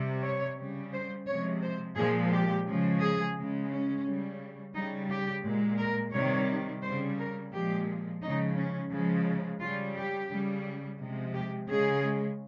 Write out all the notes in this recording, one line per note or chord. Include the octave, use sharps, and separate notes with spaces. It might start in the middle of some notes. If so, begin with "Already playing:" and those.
Already playing: C3 G3
C#5
C#3 G3
C5
C3 F3 G#3 C#5
C5
A#2 F3 G#3 G#4
G4
C#3 F3 G#3
G#4
C#3 G#3
C#4
C#3 G3
C#3 G3 D#4
G4
A#2 G#3
A#4
C3 D#3 G3 C#5
C#3 G3 C5
A#4
A#2 F3 G#3 G4
C#3 F3 G#3 D#4
C#4
C#3 F3 G#3
C#3 G3 F4
G4
C#3 G3
C3 F3 G#3
G4
C#3 G#3 G#4